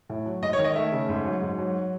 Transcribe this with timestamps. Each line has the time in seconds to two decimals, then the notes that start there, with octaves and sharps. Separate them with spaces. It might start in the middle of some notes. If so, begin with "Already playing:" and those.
0.09 A2
0.26 F#3
0.42 G#2 D#5
0.53 C#5
0.59 D#3
0.64 D#5
0.75 A3 E5
0.92 C#3
1.09 G#2
1.25 F#3
1.42 G#2
1.58 F#3